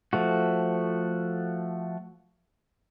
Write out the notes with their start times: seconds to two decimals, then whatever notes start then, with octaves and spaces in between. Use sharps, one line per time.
0.13 F3 A3 F#4